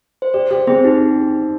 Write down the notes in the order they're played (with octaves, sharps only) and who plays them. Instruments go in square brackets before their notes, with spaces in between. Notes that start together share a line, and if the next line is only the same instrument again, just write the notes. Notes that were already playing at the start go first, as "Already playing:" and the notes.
[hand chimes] C5
[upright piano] G4 [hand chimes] D5
[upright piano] G4 [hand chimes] C5
[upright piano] C4 [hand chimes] G#4
[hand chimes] D#4 [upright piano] G4